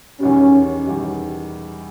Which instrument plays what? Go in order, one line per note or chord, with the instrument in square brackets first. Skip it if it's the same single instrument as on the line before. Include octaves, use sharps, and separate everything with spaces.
[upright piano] E2 D#3 G3 [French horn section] C#4
[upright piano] E2 D#3 G3